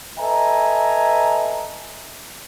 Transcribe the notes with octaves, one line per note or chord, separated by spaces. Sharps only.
A4 B4 D#5 E5 G#5 A#5